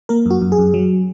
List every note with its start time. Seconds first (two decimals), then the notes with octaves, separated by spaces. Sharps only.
0.09 A#3 A#4
0.26 F#2 F#4
0.42 F#2
0.52 G#4
0.58 F#2
0.74 F#3